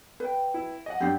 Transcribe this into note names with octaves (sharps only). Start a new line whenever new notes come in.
B4 G5
E4
D#5 F#5
F#2 D4 G4